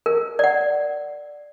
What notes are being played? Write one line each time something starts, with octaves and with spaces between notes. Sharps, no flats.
A#4
D5 F#5